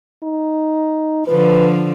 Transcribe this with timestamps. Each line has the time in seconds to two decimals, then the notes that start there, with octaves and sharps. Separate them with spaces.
0.23 D#4
1.27 D3 F3 B4